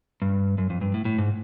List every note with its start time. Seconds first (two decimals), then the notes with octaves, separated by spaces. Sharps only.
0.22 G2
0.58 F#2
0.70 F2
0.81 G2
0.94 A2
1.05 A2
1.18 G#2